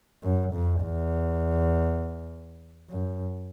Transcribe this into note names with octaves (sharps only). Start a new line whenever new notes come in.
F#2
F2
E2
F#2